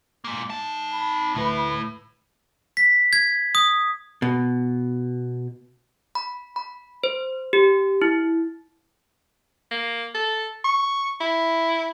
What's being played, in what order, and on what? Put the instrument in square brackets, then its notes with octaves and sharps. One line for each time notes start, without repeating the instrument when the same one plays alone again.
[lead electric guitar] G#3 A#3
D#4 A5
[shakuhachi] B5
[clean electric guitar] D2 E4 B4 [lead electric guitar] A2
[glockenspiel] B6
G#6
D#6
[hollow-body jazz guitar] B2
[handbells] B5
B5
C5
G4
E4
[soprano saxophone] A#3
A4
C#6
E4